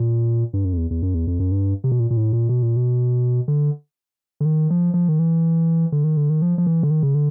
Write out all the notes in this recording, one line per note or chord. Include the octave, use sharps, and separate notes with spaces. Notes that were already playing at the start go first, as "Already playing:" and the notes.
Already playing: A#2
G2
F#2
F2
E2
E2
F#2
E2
F2
F#2
G2
C3
B2
A#2
A#2
A2
A#2
B2
A#2
B2
D3
D3
D#3
F3
F3
D#3
E3
D3
D#3
D3
D#3
F3
F3
E3
D3
D#3
C#3
D3